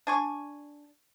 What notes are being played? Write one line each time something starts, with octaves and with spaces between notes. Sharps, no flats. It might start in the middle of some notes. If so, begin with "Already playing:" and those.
D4 G#5 C#6